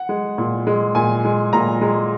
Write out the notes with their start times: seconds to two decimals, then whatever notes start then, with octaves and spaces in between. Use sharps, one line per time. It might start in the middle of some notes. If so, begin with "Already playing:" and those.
Already playing: F#5
0.09 G#3
0.38 A#2
0.67 G#3
0.95 A#2 G#5
1.25 G#3
1.53 A#2 A#5
1.81 G#3